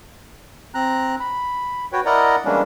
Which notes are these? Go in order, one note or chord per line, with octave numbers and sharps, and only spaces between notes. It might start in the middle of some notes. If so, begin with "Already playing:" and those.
C4 A#5 F#6
B5
F#4 B4 C#5 G5
E4 A#4 D5 D#5 F#5 A#5
E3 G3 G#3 A#3 C#4 D4